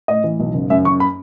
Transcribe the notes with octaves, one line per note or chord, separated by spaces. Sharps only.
A2 D#5
E3
B1
F#1
F#2 E5
F#1 C#6
B5